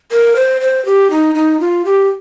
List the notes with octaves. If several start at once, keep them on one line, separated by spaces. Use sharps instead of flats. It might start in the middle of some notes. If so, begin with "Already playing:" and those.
A#4
C5
C5
G4
D#4
D#4
F4
G4